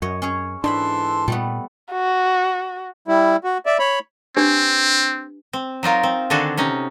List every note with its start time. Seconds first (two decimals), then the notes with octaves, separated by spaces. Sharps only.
0.02 F#2 C#5 D#5
0.22 C#4 G#4 C#5
0.64 G#2 E3 D4 A4 C5 B5 C6
1.28 A#2 G3 A3 B3
1.92 F#4
3.08 G3 E4
3.44 F#4
3.66 D5 E5
3.79 C#5 B5
4.37 C4 D4 G4 B4
5.53 C4
5.83 F#3 D#4 F4 A#4
6.03 C4
6.30 D3 D#3 D4 F#4 G#4 A4
6.57 C3 C#4 D#4